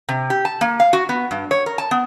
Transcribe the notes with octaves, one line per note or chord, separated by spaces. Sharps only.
C3
G4
A5
A#3
F5
F#4
B3
G2
C#5
A#4
A5
B3